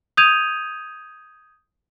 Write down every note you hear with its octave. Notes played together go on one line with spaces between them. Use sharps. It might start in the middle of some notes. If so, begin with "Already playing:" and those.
D#6 G6 G#6 D#7 F7